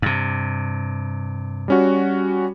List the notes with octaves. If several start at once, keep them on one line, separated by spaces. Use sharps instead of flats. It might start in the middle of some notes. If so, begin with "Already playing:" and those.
G2 C3
G3 C#4 F#4